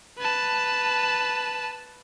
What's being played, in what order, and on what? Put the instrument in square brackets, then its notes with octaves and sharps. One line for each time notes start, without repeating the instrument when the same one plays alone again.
[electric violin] B4 A5